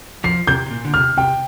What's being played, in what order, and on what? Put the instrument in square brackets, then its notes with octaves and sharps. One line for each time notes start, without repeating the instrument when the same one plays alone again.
[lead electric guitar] F3 [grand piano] C7
[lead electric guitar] C3 [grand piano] G6
[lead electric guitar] C3
A#2
D3
[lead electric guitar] C3 [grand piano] F6
[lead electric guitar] C3 [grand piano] G5